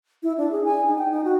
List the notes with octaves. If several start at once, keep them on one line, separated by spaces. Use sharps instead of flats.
E4
D4
G#4
G#5
D#4
G5
D#4
F#4